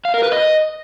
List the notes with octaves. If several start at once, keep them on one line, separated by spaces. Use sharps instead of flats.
F5
A#4
B4
D#5